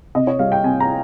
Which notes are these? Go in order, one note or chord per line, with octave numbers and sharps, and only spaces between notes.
C3 D#5
C#5
G3 F5
G5
C3 G#5
A#5